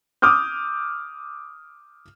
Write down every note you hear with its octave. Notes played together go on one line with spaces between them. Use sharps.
D6 D#6 F6 G6